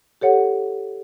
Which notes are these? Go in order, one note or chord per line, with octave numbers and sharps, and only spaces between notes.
G4 A4 C#5 F#5